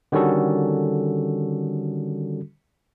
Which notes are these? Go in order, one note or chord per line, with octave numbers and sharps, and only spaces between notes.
D3 D#3 G3 C#4 F#4 A4